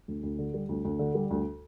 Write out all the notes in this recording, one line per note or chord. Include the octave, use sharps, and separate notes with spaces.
D2
D2
D3
G3
D2
D2
D3
G3
D2